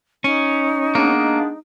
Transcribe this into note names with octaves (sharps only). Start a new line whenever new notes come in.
C#4 D#4
G#3 A#3 B3 D4